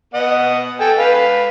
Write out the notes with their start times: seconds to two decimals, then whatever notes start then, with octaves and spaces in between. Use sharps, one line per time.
0.14 B3 D#5 F#5
0.80 A4 G5 G#5
0.99 B4 F5